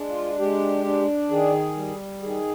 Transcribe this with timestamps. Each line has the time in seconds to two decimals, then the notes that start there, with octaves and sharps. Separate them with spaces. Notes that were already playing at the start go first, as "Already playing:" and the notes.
Already playing: G#3 D4
0.09 F4
0.39 G#3 G4
0.85 D4
1.30 D#3 G#4
1.77 G3
2.22 D#3 G#4